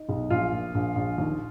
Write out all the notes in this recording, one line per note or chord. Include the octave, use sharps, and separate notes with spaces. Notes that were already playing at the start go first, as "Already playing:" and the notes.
Already playing: D#4
B1
A#1 F4
A#2
A#1
A#1
D#2